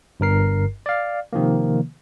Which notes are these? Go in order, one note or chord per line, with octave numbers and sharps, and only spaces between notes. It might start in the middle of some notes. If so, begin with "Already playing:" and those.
G1 G2 A#4 C7
D5 F5
C3 D#3 F3 A#3